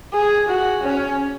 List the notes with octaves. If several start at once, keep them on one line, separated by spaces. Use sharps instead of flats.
G#4
F#4
C#4